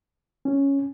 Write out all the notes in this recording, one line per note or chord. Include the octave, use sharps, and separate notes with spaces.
C#4